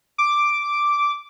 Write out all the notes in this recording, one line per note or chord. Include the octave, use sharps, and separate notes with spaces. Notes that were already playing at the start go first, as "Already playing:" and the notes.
D6